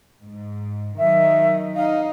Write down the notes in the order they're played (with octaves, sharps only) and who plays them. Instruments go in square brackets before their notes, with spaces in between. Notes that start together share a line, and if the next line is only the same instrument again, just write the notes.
[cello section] G#2
[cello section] D#3 F#3 D#4 [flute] E5
[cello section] D#4 [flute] F5